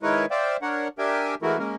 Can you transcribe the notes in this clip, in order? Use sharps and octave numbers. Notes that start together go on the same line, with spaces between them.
D#3 G#3 E4 A#4 B4 C#5
C5 D5 E5 F5 G5
D4 A#4 C#5 F#5
D4 G4 A#4 E5 G5 G#5
E3 G#3 A3 E4 F#4 A#4
G#3 A#3 C#4 A#4